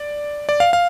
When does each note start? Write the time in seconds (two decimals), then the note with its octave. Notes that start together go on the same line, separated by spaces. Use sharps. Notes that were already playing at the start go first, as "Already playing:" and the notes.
Already playing: D5
0.49 D5
0.60 F5
0.73 F5